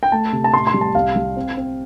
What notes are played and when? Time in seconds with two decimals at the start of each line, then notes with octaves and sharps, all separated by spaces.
0.03 G5
0.12 A3 A5
0.32 C3
0.44 A5
0.54 A2 C6
0.67 C6
0.74 G3
0.81 A5
0.95 C2 F5
1.16 G3
1.36 C4
1.57 C4